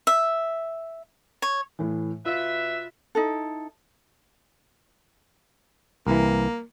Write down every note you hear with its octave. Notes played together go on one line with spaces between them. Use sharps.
E5
C#5
A2 E3
B2 F4 B4 E5
D#4 E4 A4
C2 E3 A#3